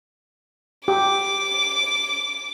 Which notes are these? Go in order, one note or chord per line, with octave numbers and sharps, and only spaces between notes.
G4 D6